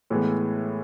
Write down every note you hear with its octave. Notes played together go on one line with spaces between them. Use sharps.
A2 E3 G#3 B3